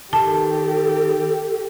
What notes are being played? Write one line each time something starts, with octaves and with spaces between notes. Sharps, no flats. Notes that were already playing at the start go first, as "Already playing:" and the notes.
D#3 G4 A4 A5